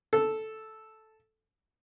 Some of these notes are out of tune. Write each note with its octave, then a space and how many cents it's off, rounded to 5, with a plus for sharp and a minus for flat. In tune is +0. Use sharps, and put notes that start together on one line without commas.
A4 -5